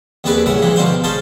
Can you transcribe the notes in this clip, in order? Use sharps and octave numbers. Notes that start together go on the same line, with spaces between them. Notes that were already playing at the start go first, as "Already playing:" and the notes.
D#2 C3 D4 G#4 B4 D5
C2 A2 C#3 E5 F#5 G#5
C3 E3 F3 G#3
D2 B2 D4 F#4 C5 F5
C#4 F4 G#4 A4 C5 A5